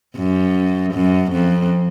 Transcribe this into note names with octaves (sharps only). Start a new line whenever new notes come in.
F#2
F#2
F2